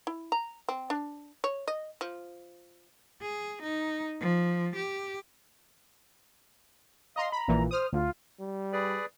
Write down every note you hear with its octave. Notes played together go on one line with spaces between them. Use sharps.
E4
A#5
C4
D4
C#5
D#5
F3
G#4
D#4
F3
G4
D#5 F5 A#5 C6
A#5 B5
A#1 A#2 E3
C5 D#6 F6
D2 F4
G3
G#4 B4 D5